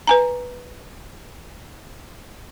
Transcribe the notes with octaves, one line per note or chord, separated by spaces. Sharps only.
B4 G#5 A#5